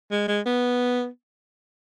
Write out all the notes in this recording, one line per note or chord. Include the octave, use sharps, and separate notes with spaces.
G#3
G#3
B3